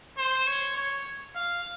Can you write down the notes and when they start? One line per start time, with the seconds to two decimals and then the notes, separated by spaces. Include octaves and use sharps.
0.18 C5
0.47 C#5
0.76 C#5
1.36 F5